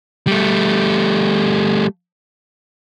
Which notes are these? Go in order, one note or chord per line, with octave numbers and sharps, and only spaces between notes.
G3 A3